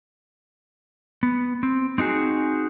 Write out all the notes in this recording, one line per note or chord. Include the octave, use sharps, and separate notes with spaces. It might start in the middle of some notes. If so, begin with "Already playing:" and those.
B3
C4
C4 D#4 F#4 G#4